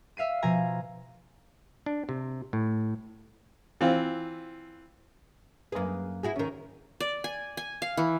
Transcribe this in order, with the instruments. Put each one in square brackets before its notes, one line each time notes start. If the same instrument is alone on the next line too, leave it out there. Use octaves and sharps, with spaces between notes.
[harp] E5 F5 C7 D#7
B2 F3 F5 G#5 A#5
[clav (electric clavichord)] D4
C3
A2
[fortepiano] E3 C4 F4
[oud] F#2 G#4 [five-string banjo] A#3 B4
[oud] E4 F#4 G#4
[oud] D#2 D#3 [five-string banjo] C#4 A#4
[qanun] D5
G#5
G#5
F5
E3